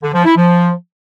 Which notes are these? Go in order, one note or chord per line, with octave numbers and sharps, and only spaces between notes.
D3
F3
E4
F3